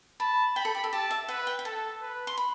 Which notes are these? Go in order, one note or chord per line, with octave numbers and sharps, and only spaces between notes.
A5 B5
G5 B5
A4
G4
A4
G4 A5
E5
B4 F#5
G5
G5
A4 A5
B4
C6
B5